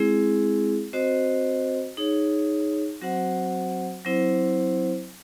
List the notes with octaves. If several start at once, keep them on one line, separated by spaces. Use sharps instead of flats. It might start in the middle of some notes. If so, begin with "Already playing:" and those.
Already playing: G#3 C4 E4 G#4
C4 F#4 C5 D#5
D#4 G#4 C#5
F#3 C4 F#4 C5 F#5
F#3 C4 E4 C5